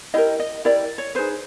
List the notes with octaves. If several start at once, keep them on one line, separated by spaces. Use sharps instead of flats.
E4 G4 A#4 D#5
D#5
E4 G4 A#4 D5
C#5
D#4 G#4 B4 C5